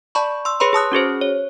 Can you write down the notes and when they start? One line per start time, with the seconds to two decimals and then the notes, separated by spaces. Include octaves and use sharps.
0.15 D5 A5 B5 C#6
0.45 C6 E6
0.60 G#4 B4 C#5 B5 C6
0.73 G#4 A5 D#6 F#6
0.92 C#4 F#4 G#4 C5
1.21 C#5